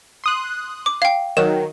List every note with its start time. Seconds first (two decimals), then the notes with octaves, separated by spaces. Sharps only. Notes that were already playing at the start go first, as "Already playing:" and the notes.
0.24 C6 D#6 F#6
0.86 D6
1.02 F5 G5
1.37 D#3 F#3 E7